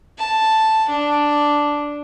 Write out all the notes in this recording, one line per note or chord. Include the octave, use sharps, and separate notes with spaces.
A5
D4